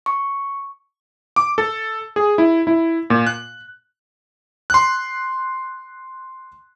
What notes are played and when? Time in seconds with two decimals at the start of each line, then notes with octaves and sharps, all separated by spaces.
0.06 C#6
1.36 D6
1.58 A4
2.16 G#4
2.38 E4
2.67 E4
3.10 A#2
3.27 F#6
4.70 C6 F#6